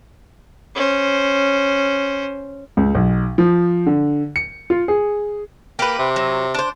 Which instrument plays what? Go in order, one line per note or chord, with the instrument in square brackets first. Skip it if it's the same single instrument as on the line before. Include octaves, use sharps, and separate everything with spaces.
[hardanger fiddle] C#4 C5
[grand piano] C#2
B1
F3
D3
C#7
F4
G#4
[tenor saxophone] A#3 [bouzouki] G4 B4
[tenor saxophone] C3
[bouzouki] F#3
D4 C5